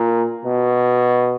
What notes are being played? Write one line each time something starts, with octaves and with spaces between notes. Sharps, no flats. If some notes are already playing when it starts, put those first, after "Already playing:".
Already playing: A#2
B2